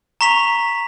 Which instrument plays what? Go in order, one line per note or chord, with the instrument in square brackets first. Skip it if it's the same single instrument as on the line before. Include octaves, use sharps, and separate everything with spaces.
[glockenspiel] A#5 C#6 B6 F7